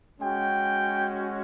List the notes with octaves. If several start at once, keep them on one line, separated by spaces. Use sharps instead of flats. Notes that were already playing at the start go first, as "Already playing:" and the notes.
G#3 C#4 F#4 G5